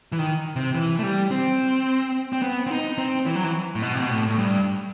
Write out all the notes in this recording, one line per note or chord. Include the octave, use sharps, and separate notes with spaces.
E3
D#3
C3
E3
A3
G3
C4
C4
B3
C4
D#4
C4
E3
F#3
E3
A2
B2
C3
B2
A2
A2
G2